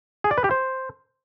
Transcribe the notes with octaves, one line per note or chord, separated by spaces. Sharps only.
G#4
D5
B4
G4
C5